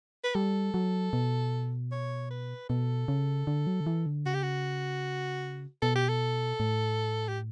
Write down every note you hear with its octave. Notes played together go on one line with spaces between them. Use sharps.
B4
G3 A4
F#3
B2
C#5
B4
B2 A4
C#3
D3
F#3
D3
E3
D3
C#3 F#4
G4
F#4
B2 A4
G4
A4
A2
G4